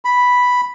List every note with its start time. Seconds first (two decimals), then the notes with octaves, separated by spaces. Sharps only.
0.05 B5